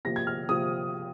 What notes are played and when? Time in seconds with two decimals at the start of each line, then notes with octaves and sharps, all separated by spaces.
0.05 C3 F3 A#3 A#6
0.16 G#6
0.27 F6
0.49 C3 F3 A#3 D#6